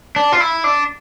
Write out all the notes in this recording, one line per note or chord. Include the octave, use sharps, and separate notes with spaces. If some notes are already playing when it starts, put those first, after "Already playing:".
D4
F4
E4
D4